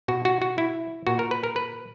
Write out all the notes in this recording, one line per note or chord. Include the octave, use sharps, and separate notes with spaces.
B2 F#4
F#4
F#4
E4
A#2 F#4
A#4
B4
A#4
B4